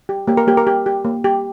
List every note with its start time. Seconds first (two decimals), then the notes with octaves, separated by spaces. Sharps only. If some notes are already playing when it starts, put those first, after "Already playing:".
0.09 G4
0.28 A#3 G4
0.37 A#4
0.47 A#3 G4
0.57 A#4
0.67 G4
0.86 G4
1.05 A#3
1.24 G4